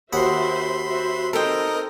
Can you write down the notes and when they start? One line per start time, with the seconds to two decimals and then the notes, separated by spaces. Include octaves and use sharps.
0.13 D#2 F#4 C5 E5 F#5 B5 C6
0.84 F#4 C5 E5
1.33 C4 D#4 A4 A#4 C5 D#5 G5